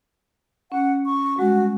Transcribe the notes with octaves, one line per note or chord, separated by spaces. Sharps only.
C#4 F#5
C#6
G3 G#3 F#4